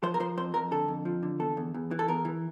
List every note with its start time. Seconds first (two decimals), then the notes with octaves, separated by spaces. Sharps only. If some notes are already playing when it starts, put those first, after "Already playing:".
0.03 F3 C5
0.14 A#4
0.20 F3 C5
0.37 F2 C5
0.54 F2 A#4
0.71 D3 A4
0.88 F2
1.05 F3
1.23 D3
1.40 E2 A4
1.57 E2
1.74 E2
1.91 E3
1.99 A4
2.08 E2 A#4
2.25 E3